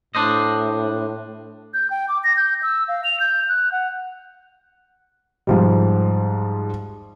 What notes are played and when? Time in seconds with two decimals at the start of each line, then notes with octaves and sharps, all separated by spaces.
0.15 A2 D4 C5 D#5
1.74 G6
1.90 G5
2.09 D6
2.24 A#6
2.37 G6
2.63 E6
2.88 F5
3.04 F7
3.20 G6
3.49 F#6
3.72 F#5
5.47 G#2 F3 G3